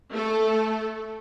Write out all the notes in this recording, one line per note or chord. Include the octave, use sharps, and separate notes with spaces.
A3 A4